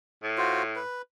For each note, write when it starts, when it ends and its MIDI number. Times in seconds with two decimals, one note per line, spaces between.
0.23 0.78 45
0.38 0.63 65
0.38 0.63 66
0.38 0.63 72
0.76 1.02 71